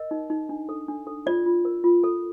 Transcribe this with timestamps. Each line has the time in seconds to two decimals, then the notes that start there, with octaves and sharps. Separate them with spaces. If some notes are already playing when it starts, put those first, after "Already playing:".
Already playing: A#4 D#5
0.11 D#4
0.30 D#4
0.49 D4
0.69 A4
0.88 D4
1.07 A4
1.26 F4 D5
1.46 F4
1.65 A#4
1.84 F4
2.04 A4